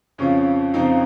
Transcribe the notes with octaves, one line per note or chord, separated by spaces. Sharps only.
F2 C#3 F3 C#4
F2 C#3 F3 C4 D#4